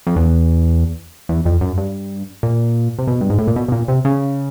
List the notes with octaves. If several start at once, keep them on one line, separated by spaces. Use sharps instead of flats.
F2
E2
E2
F2
F#2
G2
A#2
C3
B2
G2
G#2
A2
A#2
B2
B2
A#2
C3
C#3